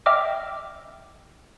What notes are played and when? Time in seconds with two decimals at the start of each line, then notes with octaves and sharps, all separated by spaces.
0.06 D#5 E5 G5 D6 E6 F6